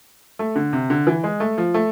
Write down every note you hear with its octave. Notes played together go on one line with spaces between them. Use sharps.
A3
D3
C3
D3
E3
G#3
A3
F3
A3